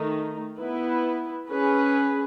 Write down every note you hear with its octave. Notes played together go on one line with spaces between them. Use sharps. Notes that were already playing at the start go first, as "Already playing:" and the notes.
Already playing: D#3 A3 D#4
B3 E4 B4
C#4 G#4 B4